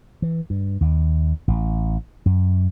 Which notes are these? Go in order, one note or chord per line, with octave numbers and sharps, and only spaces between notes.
E3
G2
D#2
A1
F#2